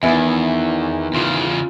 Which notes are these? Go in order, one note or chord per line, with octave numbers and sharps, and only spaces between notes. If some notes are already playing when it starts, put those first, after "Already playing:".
E2 D#3 E3 B3 E4 E5 G#5
E2 C#3 F4